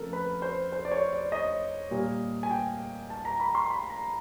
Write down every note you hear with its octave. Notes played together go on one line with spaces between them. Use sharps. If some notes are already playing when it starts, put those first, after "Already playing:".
Already playing: C#3 F3 A3 C4 A4 A#4
B4
C5
C5
D5
C#5
D5
D#5
A#2 G3 A#3
G#5
G5
A5
A#5
B5
C6
B5
A#5